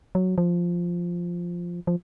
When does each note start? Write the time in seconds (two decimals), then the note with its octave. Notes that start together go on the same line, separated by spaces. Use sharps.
0.15 F#3
0.38 F3
1.87 F3